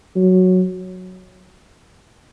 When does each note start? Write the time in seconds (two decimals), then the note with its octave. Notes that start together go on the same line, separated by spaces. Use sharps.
0.16 F#3